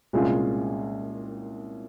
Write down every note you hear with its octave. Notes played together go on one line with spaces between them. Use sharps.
C2 A#2 G#3 C#4 F4